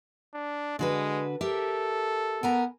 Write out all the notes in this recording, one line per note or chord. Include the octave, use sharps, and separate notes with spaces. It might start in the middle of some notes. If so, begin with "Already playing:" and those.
D4
D3 G#3 F#4 B4
G4 A4 A#4 E5
B3 A#4 G#5 A#5